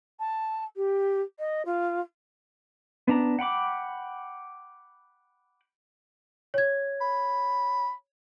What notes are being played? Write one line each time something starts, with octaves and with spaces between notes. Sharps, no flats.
A5
G4
D#5
F4
B3 D4 A#5
F#5 G5 B5 D6
C#5 G#6
B5